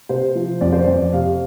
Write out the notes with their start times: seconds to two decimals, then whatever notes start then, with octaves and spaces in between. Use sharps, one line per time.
0.09 C3 C5
0.35 F3
0.61 F2 D5
0.73 C5
0.84 F2 D5
1.13 C3 F5